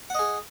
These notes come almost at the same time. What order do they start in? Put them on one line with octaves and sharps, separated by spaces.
F#5 D#5 G#4